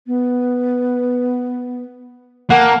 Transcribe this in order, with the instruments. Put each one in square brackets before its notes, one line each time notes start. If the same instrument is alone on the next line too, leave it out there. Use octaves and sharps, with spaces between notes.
[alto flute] B3
[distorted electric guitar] A#3 [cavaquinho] F#5 [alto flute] A5